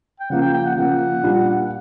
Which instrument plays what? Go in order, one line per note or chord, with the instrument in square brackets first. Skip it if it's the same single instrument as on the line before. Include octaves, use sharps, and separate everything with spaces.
[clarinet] G5
[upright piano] C#3 F3 A#3 [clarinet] F#5
[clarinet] G5
G5
F#5
[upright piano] C#3 F3 A#3 [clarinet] F#5
[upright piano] A#2 G3 A#3 D4